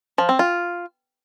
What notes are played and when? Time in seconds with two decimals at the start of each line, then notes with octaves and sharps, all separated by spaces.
0.18 F3
0.29 C4
0.39 F4